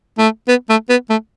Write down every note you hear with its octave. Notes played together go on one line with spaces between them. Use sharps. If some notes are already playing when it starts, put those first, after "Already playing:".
A3
B3
A3
B3
A3